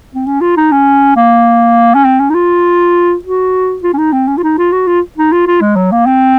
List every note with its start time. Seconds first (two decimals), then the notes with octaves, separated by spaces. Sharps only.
0.14 C4
0.27 C#4
0.41 F4
0.57 D#4
0.72 C#4
1.16 A#3
1.95 C#4
2.05 C4
2.20 C#4
2.30 D#4
2.35 F4
3.24 F#4
3.83 F4
3.93 C#4
3.98 D#4
4.13 C4
4.28 C#4
4.38 F4
4.43 D#4
4.58 F4
4.72 F#4
4.87 F4
5.18 D#4
5.33 F4
5.47 F4
5.61 G#3
5.76 F#3
5.92 A#3
6.07 C4